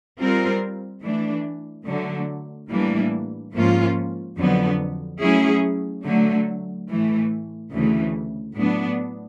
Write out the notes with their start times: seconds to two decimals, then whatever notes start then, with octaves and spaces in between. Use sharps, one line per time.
0.20 G3 C4 F4 A#4
1.02 E3 A3 D4
1.87 D3 F#3 A3
2.70 A2 E3 G3 A#3 D4
3.54 G#2 F3 A#3 C#4 F4
4.38 F2 D3 F#3 B3
5.21 F#3 A3 C#4 E4 G#4
6.05 D3 F#3 A3
6.89 A2 E3 A3
7.71 D2 C#3 E3 A3
8.56 A2 F#3 B3 D4